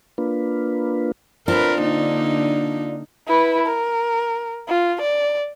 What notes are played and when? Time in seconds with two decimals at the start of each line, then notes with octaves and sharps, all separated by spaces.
0.18 A#3 D4 F4 B4
1.48 C4 D4 F4 A#4 B4
1.80 D3 A#3 D#4
3.28 E4 B4
3.66 A#4
4.68 F4
5.02 D5